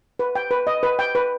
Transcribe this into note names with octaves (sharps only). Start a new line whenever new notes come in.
B4
G5
B4
D#5
B4
G5
B4